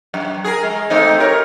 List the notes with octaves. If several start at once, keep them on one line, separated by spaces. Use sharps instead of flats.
F#2
G#4 A#4
G#3
A3 C4 D#4
G4 A#4 C#5